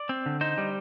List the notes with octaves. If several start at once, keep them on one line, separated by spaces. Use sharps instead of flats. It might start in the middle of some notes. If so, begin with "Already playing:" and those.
Already playing: D5
C4
D3
D#4 C5
G3